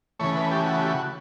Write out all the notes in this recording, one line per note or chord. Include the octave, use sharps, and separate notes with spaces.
C#3 E3 A3 C#5
B4
G4
F#4
G4
F#4